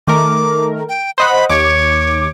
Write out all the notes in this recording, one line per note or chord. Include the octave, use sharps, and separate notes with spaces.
D#3 A3 A#4 D6
G5
C5 D#5 F#5 B5
D#2 C#5 D6